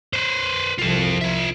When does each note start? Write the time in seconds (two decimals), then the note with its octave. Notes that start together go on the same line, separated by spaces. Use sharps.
0.13 B4 C5
0.79 C2 F3 F4 A4
1.21 F4 E5